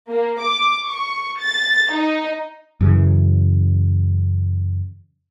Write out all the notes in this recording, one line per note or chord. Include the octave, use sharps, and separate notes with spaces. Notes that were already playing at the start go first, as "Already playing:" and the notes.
A#3
D6
C#6
A6
D#4
F#2 C#3 E3